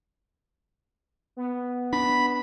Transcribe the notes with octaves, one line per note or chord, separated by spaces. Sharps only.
B3
D4 B5